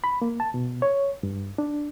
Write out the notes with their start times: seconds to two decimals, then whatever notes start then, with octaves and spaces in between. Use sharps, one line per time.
0.04 B5
0.22 A#3
0.40 A5
0.54 B2
0.82 C#5
1.23 G2
1.58 D4